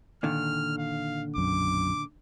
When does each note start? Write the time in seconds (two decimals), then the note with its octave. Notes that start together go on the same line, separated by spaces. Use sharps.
0.23 A#2 D3 D#3 F6
0.78 F5
1.36 B1 F#2 D6